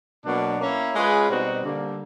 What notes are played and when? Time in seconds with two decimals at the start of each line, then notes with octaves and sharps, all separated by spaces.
0.24 B2 F#3 A#3 D4
0.58 A#3 C#4 E4
0.94 G#3 C#4 F4 G#4 B4
1.28 B2 G3 C4 D#4 F#4
1.62 D3 G3 A#3